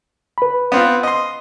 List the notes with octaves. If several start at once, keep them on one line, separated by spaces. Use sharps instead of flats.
B4 B5
B3 C4 F4
D#5 C6